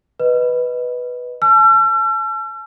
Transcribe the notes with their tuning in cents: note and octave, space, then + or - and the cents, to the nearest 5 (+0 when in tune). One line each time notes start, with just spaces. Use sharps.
B4 +0 D#5 +0
A5 -45 E6 +45